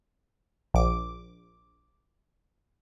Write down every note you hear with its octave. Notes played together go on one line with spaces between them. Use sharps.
A#1 D6